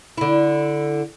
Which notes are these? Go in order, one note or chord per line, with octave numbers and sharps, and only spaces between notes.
D3 E4